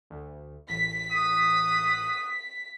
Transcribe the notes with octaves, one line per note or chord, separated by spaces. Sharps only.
D2
A1 B6
F#5 D#6